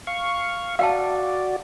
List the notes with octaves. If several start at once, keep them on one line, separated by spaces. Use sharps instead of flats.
F5 C#6
F#4 D5 F5 G5 A5